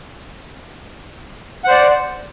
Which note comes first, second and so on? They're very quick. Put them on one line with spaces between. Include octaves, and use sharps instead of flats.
F#5 C5 D5